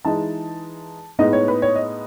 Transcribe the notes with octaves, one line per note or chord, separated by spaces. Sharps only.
E3 G#3 D#4 A5
A2 G#3 B3 D#4 D#5
C#5
B4
C#5
D#5